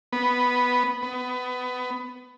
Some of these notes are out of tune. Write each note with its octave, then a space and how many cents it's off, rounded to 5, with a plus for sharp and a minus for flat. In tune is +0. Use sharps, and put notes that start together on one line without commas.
B3 +0
B3 +20